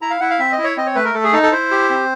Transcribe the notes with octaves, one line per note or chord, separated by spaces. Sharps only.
E4 A#5
F5
E4 F#5
F5
C4 E5
D#5
E4
C#5
C4 D#5
C#5
A3 B4
A#4
A3 A4
G#4
D#4 A4
A4
E4 C5
G4
C4